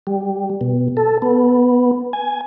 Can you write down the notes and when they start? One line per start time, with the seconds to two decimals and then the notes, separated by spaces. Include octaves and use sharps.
0.07 G3
0.61 B2
0.97 A4
1.22 B3
2.13 G#5